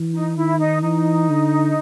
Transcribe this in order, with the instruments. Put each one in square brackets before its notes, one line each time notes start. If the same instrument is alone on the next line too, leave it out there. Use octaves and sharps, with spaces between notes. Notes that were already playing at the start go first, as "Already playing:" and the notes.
Already playing: [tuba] E3
[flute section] D#4
[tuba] D#3 [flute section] E4
[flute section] D#4
[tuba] E3 [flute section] D#4
[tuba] D3